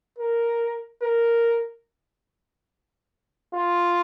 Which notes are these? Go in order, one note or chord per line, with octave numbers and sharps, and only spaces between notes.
A#4
A#4
F4